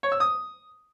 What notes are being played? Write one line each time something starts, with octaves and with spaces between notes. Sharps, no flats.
C#5
E6
D#6